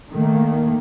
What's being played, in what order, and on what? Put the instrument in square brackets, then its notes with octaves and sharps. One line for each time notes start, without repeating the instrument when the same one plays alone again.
[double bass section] D#3 A3 A#3